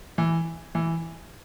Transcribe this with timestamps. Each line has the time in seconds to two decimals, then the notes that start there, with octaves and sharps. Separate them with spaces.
0.18 E3
0.75 E3